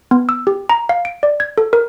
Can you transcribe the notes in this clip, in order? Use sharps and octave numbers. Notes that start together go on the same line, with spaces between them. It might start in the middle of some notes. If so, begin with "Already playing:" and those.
B3
E6
G4
A#5
F5
D7
D5
G#6
A4
A#4